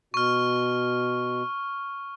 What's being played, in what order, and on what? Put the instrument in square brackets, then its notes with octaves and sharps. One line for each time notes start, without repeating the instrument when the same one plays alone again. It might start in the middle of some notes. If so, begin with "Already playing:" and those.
[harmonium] B2 [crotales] C#6 F6